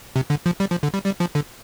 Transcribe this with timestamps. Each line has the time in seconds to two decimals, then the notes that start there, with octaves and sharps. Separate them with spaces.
0.16 C3
0.30 D3
0.46 F3
0.60 G3
0.71 F3
0.83 D3
0.94 G3
1.06 G3
1.20 F3
1.35 D3